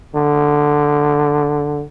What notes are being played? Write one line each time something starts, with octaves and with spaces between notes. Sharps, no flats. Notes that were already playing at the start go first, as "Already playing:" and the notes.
D3